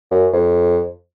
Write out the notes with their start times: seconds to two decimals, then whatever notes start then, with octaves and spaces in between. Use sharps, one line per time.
0.11 F#2
0.33 F2